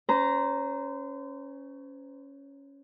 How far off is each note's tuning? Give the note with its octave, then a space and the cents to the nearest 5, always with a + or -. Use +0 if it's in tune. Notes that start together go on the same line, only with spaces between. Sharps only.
C#4 +5 C5 -35 A#5 +0